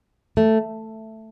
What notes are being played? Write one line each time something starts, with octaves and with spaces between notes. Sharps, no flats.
A3